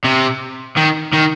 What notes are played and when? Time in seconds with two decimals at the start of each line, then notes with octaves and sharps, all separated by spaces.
0.04 C3
0.77 D#3
1.14 D#3